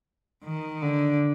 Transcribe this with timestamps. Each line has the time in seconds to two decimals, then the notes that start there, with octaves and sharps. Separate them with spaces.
0.45 D#3
0.82 D3